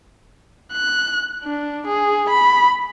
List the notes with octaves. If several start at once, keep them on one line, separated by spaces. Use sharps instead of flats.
F#6
D4
G#4
B5